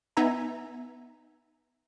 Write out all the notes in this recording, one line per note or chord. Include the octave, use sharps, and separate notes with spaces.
B3 D#4 E5 G#5 A#5